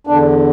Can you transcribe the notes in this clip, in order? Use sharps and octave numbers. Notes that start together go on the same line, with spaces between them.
E2 D3 D4